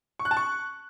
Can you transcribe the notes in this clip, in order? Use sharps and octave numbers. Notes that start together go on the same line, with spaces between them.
C#6
F#6
A5
C#6